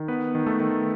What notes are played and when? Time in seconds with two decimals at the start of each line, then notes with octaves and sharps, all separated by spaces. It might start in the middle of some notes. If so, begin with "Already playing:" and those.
Already playing: D#3
0.08 B3 B4
0.35 D#3
0.46 A3 A4
0.60 D#3